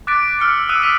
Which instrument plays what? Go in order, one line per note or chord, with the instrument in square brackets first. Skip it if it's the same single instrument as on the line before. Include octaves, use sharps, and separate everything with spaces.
[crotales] D6 F#6 A6 B6 D7
E6 F6 C#7 D7
D#6 E6 F#6 D#7
D#6 B6 D#7